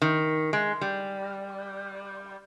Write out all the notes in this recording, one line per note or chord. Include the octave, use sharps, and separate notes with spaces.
D#3
G#3
G3